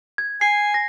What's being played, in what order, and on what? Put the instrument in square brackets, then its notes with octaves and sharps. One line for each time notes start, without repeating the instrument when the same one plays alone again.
[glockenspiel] G#6
[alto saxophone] G#5 [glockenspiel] C7
[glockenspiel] A#6